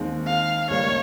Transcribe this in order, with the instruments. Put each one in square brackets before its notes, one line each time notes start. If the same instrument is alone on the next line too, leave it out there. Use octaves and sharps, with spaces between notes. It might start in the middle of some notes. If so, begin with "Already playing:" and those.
Already playing: [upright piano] D#2 D#3 G#3 C4
[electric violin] F5
[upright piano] C#2 C#3 G3 A#3 [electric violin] C#5